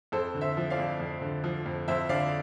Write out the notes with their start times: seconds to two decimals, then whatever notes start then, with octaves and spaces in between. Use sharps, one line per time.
0.12 F2 A4 C5
0.35 D3
0.41 C5 E5
0.57 F3
0.70 D5 F5
0.78 F2
1.00 F2
1.22 D3
1.44 F3
1.66 F2
1.88 F2 C5 E5
2.09 D3 D5 F5